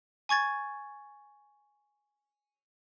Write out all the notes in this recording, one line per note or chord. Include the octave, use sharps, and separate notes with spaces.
G#5 C#6 G#6 A6